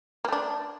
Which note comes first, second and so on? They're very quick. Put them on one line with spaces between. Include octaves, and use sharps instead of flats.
A#3 A3 D4